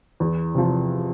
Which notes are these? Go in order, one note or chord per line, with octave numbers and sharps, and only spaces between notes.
E2
C3 F3